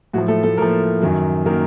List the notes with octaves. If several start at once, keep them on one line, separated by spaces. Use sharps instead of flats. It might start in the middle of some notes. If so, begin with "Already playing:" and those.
A2 F3 F#3 F#4
A3 A4
A3 A4
A2 F3 A#3 A#4
F#2 D#3 F#3
D#3 F#3 A#3 A#4